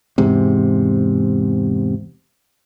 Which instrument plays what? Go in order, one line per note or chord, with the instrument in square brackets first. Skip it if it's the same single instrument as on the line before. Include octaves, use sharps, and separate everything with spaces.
[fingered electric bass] E2 G#2 C3